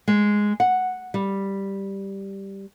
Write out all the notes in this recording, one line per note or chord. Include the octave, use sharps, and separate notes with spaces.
G#3
F#5
G3